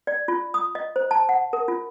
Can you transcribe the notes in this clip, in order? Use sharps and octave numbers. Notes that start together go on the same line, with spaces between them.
D5
F4
D#6
D#5
C5
A5
F#5
A#4
F4